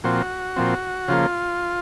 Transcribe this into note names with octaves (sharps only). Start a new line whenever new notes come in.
A#2 F3 C4 F#4
A#2 F3 C4
C#3 F3 A#3 F4